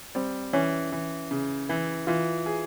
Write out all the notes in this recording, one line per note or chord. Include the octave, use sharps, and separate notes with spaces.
G3 C4
E3 C#4
E3
C#3
E3 E4
E3 F4
G#4